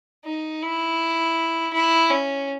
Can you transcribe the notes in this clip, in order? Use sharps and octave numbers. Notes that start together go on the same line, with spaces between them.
D#4
E4
E4
C#4